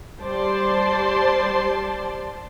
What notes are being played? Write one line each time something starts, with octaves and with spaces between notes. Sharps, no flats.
G3 C5 D5 A5 C6